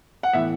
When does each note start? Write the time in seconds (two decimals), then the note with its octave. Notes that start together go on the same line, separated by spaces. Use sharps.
0.23 F#5
0.33 A2 E3 B3 E5